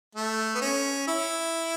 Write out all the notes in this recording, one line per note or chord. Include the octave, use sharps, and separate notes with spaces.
A3
B3
C#4
E4